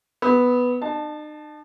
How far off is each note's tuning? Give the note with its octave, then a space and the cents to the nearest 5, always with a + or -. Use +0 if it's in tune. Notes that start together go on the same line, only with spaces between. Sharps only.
B3 +0 E6 -40
D#4 -45 A5 +0